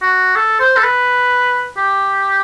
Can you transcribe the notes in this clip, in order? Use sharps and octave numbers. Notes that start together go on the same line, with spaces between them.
F#4
A4
C5
A4
B4
G4